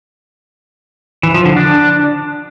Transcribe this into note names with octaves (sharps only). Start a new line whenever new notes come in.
E3
F3
D3
D4